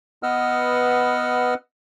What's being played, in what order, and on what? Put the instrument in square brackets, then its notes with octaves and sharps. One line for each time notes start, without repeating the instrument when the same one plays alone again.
[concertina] B3 B4 D#5 F#5 E6 F6